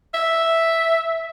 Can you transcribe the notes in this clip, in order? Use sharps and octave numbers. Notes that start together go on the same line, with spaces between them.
E5